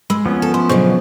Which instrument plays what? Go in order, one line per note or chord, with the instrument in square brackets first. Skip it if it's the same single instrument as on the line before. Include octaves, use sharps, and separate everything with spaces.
[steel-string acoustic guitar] G#3 [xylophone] B5 E6
[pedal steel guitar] F3 B3 C#4
[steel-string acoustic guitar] A4
[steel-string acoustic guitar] E4 [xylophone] C6
[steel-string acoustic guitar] B2 D3 F#3 [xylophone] G#4 C5 C#6